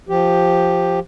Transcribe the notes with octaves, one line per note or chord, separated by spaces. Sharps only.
F3 G4